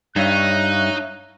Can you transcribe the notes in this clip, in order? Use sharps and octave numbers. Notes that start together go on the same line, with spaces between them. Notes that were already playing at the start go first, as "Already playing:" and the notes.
G2 D#4 C#5 E5 F5 F#6